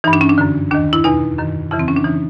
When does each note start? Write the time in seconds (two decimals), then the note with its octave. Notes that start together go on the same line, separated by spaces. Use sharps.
0.04 G2 E3 D#4
0.13 D4
0.21 C#4
0.29 D4
0.38 F#2 D3
0.71 D#2 D#3 D4
0.93 E4
1.04 E2 B2 D#4
1.38 F#2 D#3
1.71 F2 C#3 E3 E4
1.79 C4
1.88 C#4
1.96 D4
2.04 C#3 E3 D#4